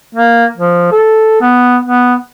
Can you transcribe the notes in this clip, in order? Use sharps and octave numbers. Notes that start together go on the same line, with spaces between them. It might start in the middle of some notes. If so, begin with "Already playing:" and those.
A#3
F3
A4
B3
B3